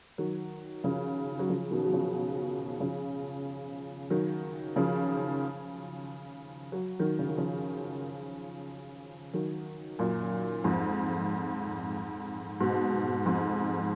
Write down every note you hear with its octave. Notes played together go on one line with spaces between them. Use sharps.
D#3 F#3
C#3 F3
F#3
C#3 F3
B2 D#3
F#3
C#3 F3
C#3 F3
D#3 F#3
C#3 F3
F#3
D#3 F#3
C#3
D#3
C#3 F3
D#3 F#3
F#2 A#2
F2 G#2
G#2 B2
F2 G#2